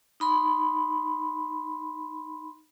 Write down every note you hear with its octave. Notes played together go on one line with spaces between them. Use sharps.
D#4 B5 C6